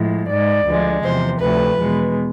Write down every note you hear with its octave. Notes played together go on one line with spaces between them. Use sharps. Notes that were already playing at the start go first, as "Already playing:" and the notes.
Already playing: A2 F3 G#3
G#2 G#3 D5
D2 D3 F3 G#3
E2 C3 F3 C5
D2 C3 F3 A3 B4
E2 B2 G#3